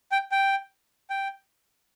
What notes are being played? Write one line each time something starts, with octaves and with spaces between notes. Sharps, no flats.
G5
G5
G5